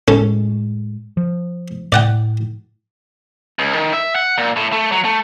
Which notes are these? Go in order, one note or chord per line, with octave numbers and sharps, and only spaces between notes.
A2 G#3 C#4 A4
F3
A2 D5 F#5 G5
C#2
D#3
E5
F#5
A#2
A2
A3
F#3
A3